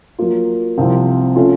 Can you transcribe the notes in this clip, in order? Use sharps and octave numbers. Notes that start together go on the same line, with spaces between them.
F#3 A#3 F4
C2 C3 F3 C4
C#3 A3 C#4 F4